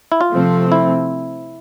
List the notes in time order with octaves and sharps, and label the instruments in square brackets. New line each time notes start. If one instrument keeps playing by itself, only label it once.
[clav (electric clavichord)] E4
F4
[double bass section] C3 F3 A3 C4
[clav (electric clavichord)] E4